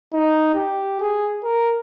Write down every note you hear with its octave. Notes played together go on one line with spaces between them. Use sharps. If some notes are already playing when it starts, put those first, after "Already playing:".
D#4
G4
G#4
A#4